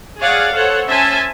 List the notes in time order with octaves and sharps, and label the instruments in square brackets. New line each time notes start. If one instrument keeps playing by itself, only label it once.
[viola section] G#4 C#5 D5 F5 F#5
A4 C5 C#5 F#5
C#4 C5 E5 G#5 A5